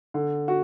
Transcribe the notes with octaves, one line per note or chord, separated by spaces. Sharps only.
D3
F#4